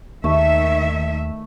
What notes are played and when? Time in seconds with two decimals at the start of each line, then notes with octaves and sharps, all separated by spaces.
0.24 D#2 D#3 A3 E5